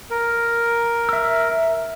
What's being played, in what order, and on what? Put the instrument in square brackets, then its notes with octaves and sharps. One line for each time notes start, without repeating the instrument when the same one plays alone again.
[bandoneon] A#4
[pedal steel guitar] E5 E6